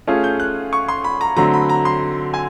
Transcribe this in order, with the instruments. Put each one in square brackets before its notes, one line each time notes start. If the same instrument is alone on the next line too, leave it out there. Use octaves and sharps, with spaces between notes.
[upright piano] A3 C#4 F4 G#4
[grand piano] G6
F#6
C#6
C6
B5
A#5
[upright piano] D3 F#3 A3 C4 [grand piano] A#5
[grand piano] B5
A#5
C6
G#5